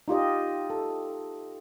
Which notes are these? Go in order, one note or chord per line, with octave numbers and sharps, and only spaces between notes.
D#4 F4 G4 D#5
A4